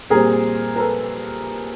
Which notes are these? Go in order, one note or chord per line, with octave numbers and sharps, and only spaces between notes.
A#2 G3 C4 G#4 A#4
A#4
A4 B4